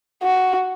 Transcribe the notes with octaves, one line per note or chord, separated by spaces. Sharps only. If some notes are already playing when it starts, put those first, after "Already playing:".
F#4